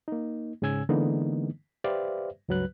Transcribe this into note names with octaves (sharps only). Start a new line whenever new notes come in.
A#3 D#4
G#2 C#3 C#4 G#5 E6 G#6
D3 E3 G#3 A#3 B3 D#4
G4 B4 C5 D5 E5 F5
C#2 G2 F#3 B4 F#6